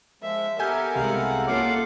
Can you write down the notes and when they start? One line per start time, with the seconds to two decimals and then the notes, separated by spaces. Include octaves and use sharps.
0.22 F3 G#3 E5
0.59 B3 G4 A4 A#4 E5 G#5 G6
0.95 C2 G#3 G4 F5 F#5
1.47 A#3 C#4 F4 A4 F5 F#5 D6